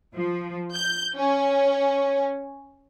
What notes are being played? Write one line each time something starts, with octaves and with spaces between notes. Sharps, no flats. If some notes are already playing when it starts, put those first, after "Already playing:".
F3
G6
C#4